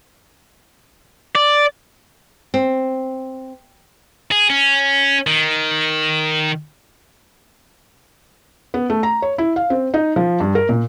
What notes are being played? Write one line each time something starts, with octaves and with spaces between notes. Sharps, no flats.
D5
C4
G#4
C#4
D#3
B3
A3
A#5
C#5
E4
F5
C4
D#4
F3
G2
A#4
A#2